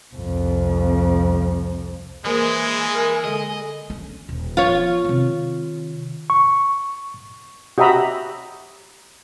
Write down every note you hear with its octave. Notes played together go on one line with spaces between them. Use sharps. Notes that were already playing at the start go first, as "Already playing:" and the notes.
C2 F2
E3 G#3 A#3 E4 G#4 A#4 C5
A#4 F6
D3 G#3 A4 D#5
C#4 D4
D#1
F3 B3 F4 C#5
C3 D#3
C#6
F#4 G4 D#5 E5 A#5 B5